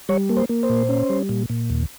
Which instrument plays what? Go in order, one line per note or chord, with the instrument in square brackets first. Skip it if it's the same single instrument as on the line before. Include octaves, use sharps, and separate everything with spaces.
[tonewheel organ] G3 C#5
A#3
C5
A#3
C5
A#2
C#4
G3
A#2
A#2
D#2